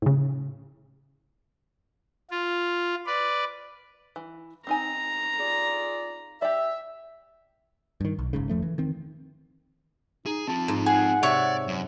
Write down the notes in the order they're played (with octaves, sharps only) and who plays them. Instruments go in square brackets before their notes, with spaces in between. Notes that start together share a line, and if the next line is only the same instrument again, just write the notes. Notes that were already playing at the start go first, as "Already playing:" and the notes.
[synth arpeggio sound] A2 C#3
[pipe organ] F4
B4 D5
[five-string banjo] E3
[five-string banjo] C4 D#4 G#5 [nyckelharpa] A#5
[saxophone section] F4 G#4 D5
[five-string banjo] G4 D5 [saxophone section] E5
[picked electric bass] G2 D#3
B1
F#1 G#2 C#3
F2 F3 A3
E3
D#3 C4
[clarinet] D#4 [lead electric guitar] G#4
[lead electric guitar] C4 F4 [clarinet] A5
[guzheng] G#2
[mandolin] G#4 [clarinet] F#5
[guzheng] C3 [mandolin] C#5 E5 C#6 [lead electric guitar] D5
[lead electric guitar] F#2